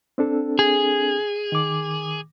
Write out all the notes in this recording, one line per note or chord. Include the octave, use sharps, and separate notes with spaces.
C4 D4 A4
G#4
D#3 D6